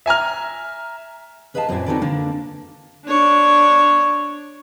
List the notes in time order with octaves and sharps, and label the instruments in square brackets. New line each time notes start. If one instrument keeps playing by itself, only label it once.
[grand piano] E5 G#5 A#5 F6
[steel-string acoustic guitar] G#4 B4 D#5 F5 G#5 A5
F#2 A#2 C4 G#4 D5 G#5
C4 D#4 F#4 A4 B4 D5
D3 A#3 D4
[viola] D4 C#5